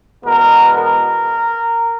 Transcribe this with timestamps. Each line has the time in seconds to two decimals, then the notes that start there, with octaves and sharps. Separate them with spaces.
0.25 E2 B2 G#3 B3 A#4
0.78 A#4